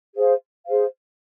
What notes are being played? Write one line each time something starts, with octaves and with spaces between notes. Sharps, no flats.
G#4 C5 F5
G#4 C5 F5